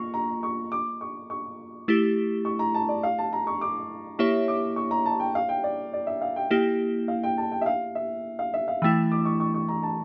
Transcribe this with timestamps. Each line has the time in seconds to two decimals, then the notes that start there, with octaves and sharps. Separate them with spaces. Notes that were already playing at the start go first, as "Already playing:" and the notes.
Already playing: A#3 F4 C#6
0.14 A#5
0.43 C#6
0.72 D6
1.01 C#6
1.30 C#6
1.88 A3 E4 G4
2.45 C#6
2.59 A#5
2.74 A5
2.89 D5
3.03 F5
3.18 A5
3.33 A#5
3.47 C#6
3.61 D6
4.19 A#3 E4 G4 C#5 E5 C#6
4.48 D6
4.76 C#6
4.91 A#5
5.06 A5
5.20 G5
5.35 F5
5.49 G5
5.64 D5
5.93 D5
6.07 E5
6.21 F5
6.36 G5
6.51 A#3 E4 G4 G5
7.08 F5
7.23 G5
7.38 A5
7.52 G5
7.61 E5
7.66 F5
7.95 E5
8.39 F5
8.54 E5
8.68 F5
8.82 E3 A3 E4 G5
9.12 D6
9.25 C#6
9.40 C#6
9.54 C#6
9.68 A#5
9.83 A5